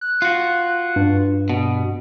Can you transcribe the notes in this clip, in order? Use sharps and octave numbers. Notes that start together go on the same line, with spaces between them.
F#6
F4 F#4
G2
B2